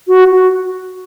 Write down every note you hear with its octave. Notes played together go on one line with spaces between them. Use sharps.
F#4
F#4